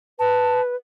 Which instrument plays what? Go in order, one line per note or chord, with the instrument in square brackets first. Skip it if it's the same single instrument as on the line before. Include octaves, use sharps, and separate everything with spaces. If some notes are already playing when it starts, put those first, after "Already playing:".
[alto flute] B4 [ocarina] A5